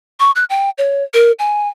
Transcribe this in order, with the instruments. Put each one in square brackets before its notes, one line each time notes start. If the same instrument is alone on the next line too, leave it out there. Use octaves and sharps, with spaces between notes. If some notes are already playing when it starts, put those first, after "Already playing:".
[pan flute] C#6
F#6
G5
C#5
A#4
G#5